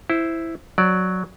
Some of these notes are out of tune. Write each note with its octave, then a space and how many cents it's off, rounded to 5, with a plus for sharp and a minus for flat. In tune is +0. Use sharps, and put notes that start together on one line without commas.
E4 +0 C5 +0
F#3 +0 D5 +0